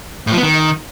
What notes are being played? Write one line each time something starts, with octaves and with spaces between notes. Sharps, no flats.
A2
F3
B3
D#3